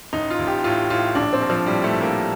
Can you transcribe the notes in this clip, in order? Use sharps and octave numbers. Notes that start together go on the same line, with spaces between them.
A1 D#4
F4
A1
G4
A2 F4
A2 F4
A#1 D4
C4
A#1
F3
A2 G3
A3
A2
A#3